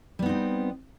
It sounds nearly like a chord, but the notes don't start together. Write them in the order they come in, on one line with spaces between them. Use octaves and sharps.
G3 B3 D#4 C4